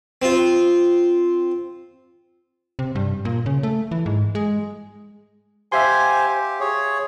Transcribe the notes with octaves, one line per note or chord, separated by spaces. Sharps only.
C4 F4
C3
G2
A#2
C#3
A3
E3
G#2
G#3
G4 C5 E5 F5 G#5 C6
G#4 C#5